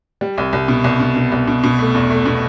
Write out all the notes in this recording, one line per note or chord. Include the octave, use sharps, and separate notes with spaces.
G3
C2
C2
B2
C2
B2
B2
C2
B2
B2
A3
E2
A3
B2